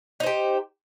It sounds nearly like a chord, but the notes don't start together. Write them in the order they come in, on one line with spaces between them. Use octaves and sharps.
D#4 C5 G4